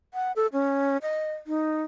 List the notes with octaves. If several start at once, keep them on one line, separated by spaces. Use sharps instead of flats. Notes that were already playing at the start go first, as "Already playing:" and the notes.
F#5
A4
C#4
D#5
D#4